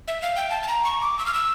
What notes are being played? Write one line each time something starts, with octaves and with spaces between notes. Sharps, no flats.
E5
F5
G5
A5
A5
A#5
C#6
D6
E6
F6
E6